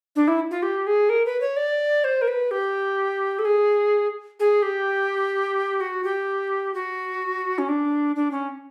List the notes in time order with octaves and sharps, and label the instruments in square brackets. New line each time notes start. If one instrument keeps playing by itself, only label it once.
[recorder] D4
E4
F4
G4
G#4
A#4
B4
C#5
D5
C5
A#4
B4
G4
A4
G#4
G#4
G4
F#4
G4
F#4
C#4
D4
D4
C#4